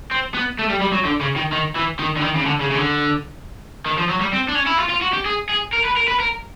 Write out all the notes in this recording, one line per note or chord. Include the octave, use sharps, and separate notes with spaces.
C4
B3
A3
G3
G3
F#3
D3
C#3
D#3
D#3
E3
D#3
D3
D#3
C#3
D3
C#3
C#3
D3
D#3
F3
F#3
G3
C4
D4
C#4
E4
F4
F4
F#4
G4
G#4
G#4
A#4
B4
A#4
B4
A#4